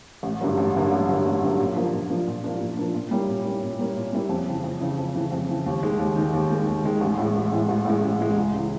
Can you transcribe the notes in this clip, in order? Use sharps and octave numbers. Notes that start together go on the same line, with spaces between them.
A1
G2 D3 F#3 A#3
A1
G2 D3 F#3 A#3
A1
G2 D3 F#3 A#3
A1
G2 D3 F#3 A#3
A#2
F3 A#3 D4
A#2
F3 A#3 D4
A#2
F3 A#3 D4
A#2
F3 A#3 D4
A#2
G3 A#3 C#4 E4
A#2
G3 A#3 C#4 E4
A#2
G3 A#3 C#4 E4
A#2
G3 A#3 C#4 E4
F2
C#3 E3
F2
C#3 E3
F2
C#3 E3
F2
C#3 E3
D#2
D#3 G#3
D#2
D#3 G#3
D#2
D#3 G#3
D#2
D#3 G#3
A1
A2 E3 G#3
A1
A2 E3 G#3
A1
A2 E3 G#3
A1
A2 E3 G#3
C#2
C#3 E3